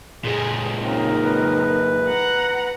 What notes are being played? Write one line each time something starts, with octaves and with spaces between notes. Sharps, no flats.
A#2 G#3 G#4
C#3 C4 D#4 A#4
B4
F#5 A#5